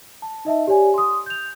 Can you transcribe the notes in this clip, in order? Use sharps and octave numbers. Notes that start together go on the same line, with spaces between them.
A5
D#4 D#5 E5 A5
G4 C#5 D5 G#5
C6 D#6
G6 F7